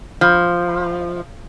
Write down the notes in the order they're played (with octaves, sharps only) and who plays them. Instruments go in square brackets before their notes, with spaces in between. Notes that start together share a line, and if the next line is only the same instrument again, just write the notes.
[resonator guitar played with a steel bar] F3